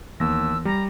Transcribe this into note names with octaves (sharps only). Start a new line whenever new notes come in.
D#2 E3 B3 E6 A#6
G3 A#5